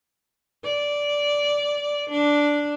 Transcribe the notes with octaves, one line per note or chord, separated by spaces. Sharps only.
D5
D4